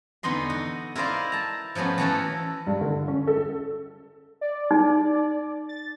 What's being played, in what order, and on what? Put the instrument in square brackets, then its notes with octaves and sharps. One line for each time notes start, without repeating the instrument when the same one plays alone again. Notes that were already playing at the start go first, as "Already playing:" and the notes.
[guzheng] E2 D3 B3 D#4 D#5 C6
D#4 F#4
E4 A#4 C5 D5 D#5 F5
A5 A#5
F3 F#3 A3 B3 C#4
E3 A3 C#4 F#4 A4 A#4
[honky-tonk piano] G2
D3
C#4
A4
[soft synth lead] D5
[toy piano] D#4
[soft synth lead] A6